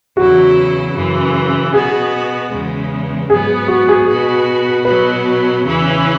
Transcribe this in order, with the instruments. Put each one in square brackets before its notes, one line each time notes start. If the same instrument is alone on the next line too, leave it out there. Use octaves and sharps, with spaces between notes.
[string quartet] E2 C#3 F#3 E4 [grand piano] F#4
[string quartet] F#2 C#3 E3
[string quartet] B2 B3 F#4 [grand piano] G#4
[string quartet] E2 C#3 G#3
[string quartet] G#2 F#3 B3 [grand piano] G#4
[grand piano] F#4
G#4
[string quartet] B2 B3 F#4
[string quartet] B2 F#3 B3 F#4 [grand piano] B4
[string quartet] E2 C#3 E3 C#4 E4